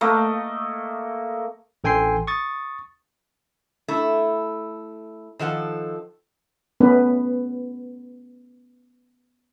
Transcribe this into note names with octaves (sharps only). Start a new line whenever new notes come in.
A3 A#3 D#5
A1 A4 G5 G#5 C6 C7
C#6 D#6 A6
A3 E4
D#3 F3 A4 F#5
A3 B3 C#4 B4